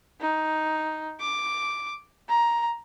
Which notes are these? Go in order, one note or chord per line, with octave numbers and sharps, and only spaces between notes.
D#4
D6
A#5